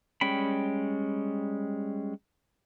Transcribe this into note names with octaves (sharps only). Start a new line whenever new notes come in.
G3 G#3 C#4 G5 B5